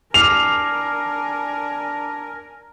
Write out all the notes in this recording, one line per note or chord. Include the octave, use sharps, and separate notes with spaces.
D4 A#4 G#5 D6 F6 C7 F7